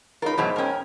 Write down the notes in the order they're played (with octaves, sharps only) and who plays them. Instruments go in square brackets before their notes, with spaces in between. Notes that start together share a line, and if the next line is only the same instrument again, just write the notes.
[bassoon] C#2 [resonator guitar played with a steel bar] D#4 A#4 [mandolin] F4 B5
[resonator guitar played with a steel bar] E2 B2 F#3 [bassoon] G#2
[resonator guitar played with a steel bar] F2 C#4 [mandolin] A#4 G5